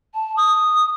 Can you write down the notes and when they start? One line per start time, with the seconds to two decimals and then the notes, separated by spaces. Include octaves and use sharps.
0.14 A5
0.37 D#6